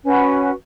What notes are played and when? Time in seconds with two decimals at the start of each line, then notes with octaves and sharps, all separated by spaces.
0.04 C#4 F#4 B4